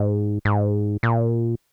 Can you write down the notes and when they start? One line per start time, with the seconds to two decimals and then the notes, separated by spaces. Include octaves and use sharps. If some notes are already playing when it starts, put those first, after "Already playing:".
Already playing: G#2
0.45 G#2
1.03 A#2